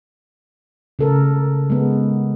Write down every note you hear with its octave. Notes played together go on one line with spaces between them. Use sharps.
C#3 A4 A#4
G#3 B3